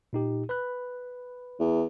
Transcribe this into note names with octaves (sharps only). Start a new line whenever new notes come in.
A#2 D#4 G4
B4 B5 F#6
E2